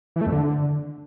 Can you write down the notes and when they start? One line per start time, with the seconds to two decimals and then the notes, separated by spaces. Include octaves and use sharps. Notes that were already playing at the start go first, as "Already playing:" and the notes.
0.16 E3
0.21 A3
0.27 F2
0.32 D3